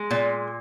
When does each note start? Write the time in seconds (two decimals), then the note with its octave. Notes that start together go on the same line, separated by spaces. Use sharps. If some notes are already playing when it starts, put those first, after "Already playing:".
Already playing: G#3
0.11 A#2